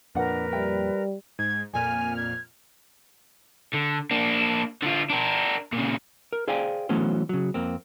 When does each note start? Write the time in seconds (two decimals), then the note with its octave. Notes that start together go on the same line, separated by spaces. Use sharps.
0.15 F2 A#2 D4 A#4 B4 F#5
0.53 G3 E5 G5
1.39 G#2 G#6
1.74 F2 A#2 G#5 F6
2.17 G#6
3.73 D3
4.11 A#3 D4
4.83 D3 F4
5.10 D4 A#4
5.73 A#2 C#3
6.32 A#4
6.48 G#4 C5 D5 F5 G5 G#5
6.89 E3 F#3 A3 B3 C#4 C5
7.29 C#3 F#3
7.54 F2 A#3 C4